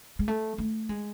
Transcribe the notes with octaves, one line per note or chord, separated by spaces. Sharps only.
G#3
A3
A3
G#3